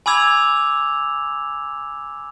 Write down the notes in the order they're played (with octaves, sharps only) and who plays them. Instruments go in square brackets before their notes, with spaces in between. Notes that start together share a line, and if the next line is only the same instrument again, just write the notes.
[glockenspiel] G#5 B5 D6 E6 G#6 F7